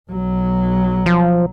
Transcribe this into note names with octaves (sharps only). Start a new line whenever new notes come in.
B1 F#3
F3